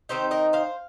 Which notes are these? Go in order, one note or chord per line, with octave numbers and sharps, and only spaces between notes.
D#3 C4 D#4 G4 C5
A#4 D#5
C5 F5